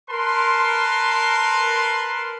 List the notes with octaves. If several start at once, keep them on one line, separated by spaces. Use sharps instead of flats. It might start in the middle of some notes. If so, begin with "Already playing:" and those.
A#4 B4 A5 C6